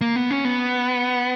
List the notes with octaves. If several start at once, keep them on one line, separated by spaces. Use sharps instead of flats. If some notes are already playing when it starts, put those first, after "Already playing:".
A#3
B3
C#4
B3